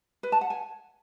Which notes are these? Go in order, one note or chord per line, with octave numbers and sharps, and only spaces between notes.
B4
A5
F#5
G#5